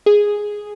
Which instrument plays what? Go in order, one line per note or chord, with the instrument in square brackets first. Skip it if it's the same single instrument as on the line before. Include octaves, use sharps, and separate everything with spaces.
[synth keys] G#4